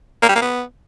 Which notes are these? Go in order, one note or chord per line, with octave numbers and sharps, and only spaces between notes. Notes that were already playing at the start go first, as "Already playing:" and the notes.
A#3
G3
A#3
B3